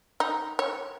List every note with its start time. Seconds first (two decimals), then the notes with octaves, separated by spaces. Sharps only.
0.20 D#4
0.59 C#5